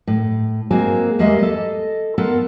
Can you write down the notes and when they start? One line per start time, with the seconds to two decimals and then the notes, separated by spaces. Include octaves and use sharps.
0.07 A2
0.71 G#3 A#3 C4 F#4 G#4
1.19 E2 G3 G#3 A#3 D#5 E5
1.39 A4 D#5
2.18 B3 F4 A4 A#4